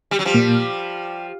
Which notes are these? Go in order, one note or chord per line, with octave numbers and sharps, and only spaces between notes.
G3
F#3
F3 G3
A#2 A#3